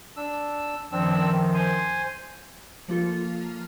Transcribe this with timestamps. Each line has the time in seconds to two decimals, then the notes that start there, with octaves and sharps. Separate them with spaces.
0.17 D4 E6
0.92 F#2 D#3 F3 C4 D4 E6
1.55 C5 G#5 C6
2.88 F3 A#3 F4 A4